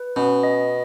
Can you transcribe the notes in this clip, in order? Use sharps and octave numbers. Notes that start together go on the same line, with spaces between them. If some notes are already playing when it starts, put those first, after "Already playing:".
Already playing: B4
B2 C#4
D#5